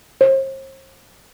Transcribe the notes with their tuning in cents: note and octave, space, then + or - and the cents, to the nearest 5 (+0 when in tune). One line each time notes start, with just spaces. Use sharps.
C5 +40